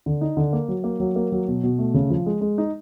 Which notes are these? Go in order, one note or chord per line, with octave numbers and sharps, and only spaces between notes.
D3
D#4
D3
A#3
F#3
A#3
F#3
A#3
F#3
B2
B2
A3
C#3
F3
G#3
G#3
D#4